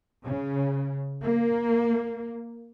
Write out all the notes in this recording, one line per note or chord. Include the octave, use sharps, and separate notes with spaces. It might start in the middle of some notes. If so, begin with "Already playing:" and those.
C#3
A#3